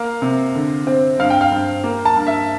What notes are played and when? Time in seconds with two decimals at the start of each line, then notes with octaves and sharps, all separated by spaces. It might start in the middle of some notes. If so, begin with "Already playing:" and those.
Already playing: A#3 F5
0.22 C3
0.55 D3
0.87 C4
1.19 G2 F5
1.30 G5
1.41 F5
1.52 G2
1.84 A#3
2.05 A5
2.16 G2
2.27 E5